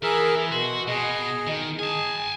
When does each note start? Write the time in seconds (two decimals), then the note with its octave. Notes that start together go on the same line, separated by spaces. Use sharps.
0.03 E3 G#4 A#4 E5
0.51 B2 F#4 C6
0.88 B2 G#4 D#5
1.47 D#3
1.79 G#4 G#5 A5